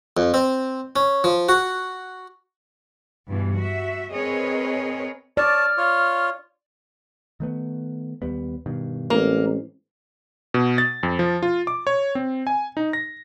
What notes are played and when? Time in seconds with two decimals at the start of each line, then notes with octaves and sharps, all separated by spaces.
0.17 F2
0.34 C4
0.96 C#4
1.24 F3
1.49 F#4
3.27 G2 B2 E3
3.56 F#4 E5
4.13 C4 G#4 A#4 B4 C#5 D#5
5.37 C#5 D5 A5 F6
5.77 F4 C#5
7.40 D#3 A3 B3
8.22 D#2 G3 B3
8.66 G2 B2 D#3
9.10 A1 G#3 A#3 C4
10.54 B2
10.78 A6
11.03 F2
11.19 F3
11.43 F4
11.67 D6
11.87 C#5
12.15 C4
12.47 G#5
12.77 D#4
12.93 A#6